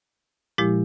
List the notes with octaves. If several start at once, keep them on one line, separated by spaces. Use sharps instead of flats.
A#2 F3 G#3 E4 G4